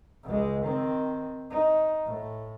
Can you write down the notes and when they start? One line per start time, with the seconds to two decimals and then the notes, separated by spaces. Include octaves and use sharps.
0.24 C#2 G#3
0.63 D#3 C4
1.50 D#4
2.05 A2